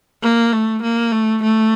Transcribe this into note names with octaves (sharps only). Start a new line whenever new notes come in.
A#3
A3
A#3
A3
A3